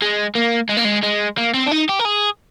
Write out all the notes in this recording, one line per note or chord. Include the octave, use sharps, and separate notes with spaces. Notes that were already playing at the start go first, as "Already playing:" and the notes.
G#3
A#3
G#3
A#3
G#3
G#3
A#3
C4
D4
D#4
G4
A#4
G#4